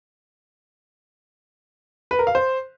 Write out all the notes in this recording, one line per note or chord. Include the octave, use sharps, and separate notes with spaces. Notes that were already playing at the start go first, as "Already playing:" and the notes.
B4
A#4
F5
C5